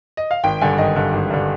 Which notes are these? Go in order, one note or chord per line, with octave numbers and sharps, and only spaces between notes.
D#5
F5
G#1 G5
G2 D3 G#5
G#1 D#5
G2 D3
G#1
G2 D3